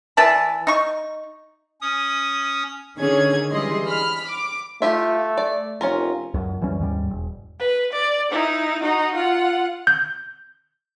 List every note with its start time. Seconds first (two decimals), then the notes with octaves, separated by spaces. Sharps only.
0.17 E3 D5 A5 B5
0.67 D#4 C#6
1.81 C#4 D#6
2.98 D3 D#3 C#4 G#4 C#5 G#6
3.51 E3 G3 G#3 G#4 D#5 C6
3.87 B5 F6 B6
4.27 D6
4.82 A3 F4 G4 E5
5.37 D5
5.81 F1 C#4 F4 A#4
6.34 C#2 F#2
6.61 F#2 E3 G3 C#4
6.79 D#2 G#2 G3
7.10 E1
7.59 B4
7.92 D5
8.31 D#4 E4
8.82 D#4 F#4
9.15 F4 F#5
9.87 G6